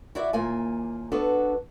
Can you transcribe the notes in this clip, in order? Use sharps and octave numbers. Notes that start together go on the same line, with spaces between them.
E4 F#4 D5 E5
D#2 A#2 A#3 G#5
B3 D4 F#4 A4 B4